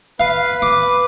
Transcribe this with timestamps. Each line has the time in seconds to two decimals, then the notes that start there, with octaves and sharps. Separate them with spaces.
0.20 B4 F5
0.62 D6